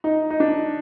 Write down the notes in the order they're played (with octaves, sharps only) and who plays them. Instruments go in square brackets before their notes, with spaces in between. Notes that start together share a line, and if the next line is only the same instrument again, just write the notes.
[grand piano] D#4
D#4
D4